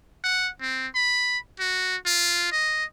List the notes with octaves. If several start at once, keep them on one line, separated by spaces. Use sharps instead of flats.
F#5
C4
B5
F#4
F4
D#5